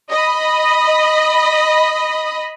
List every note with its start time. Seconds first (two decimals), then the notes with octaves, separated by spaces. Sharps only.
0.10 D#5 B5